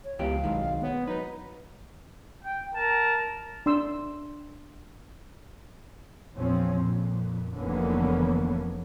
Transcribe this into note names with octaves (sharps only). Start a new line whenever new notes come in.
C#5
C#2 E3 B3 G4 F5
B1 D#3 G#3
B3 C#5
F#3 D#4 B4
G5
A#4 A5
D4 C6 E6
A#1 E2 F3 C4 C#4
F2 A#2
F1 D3 E3 A#3 B3 C#4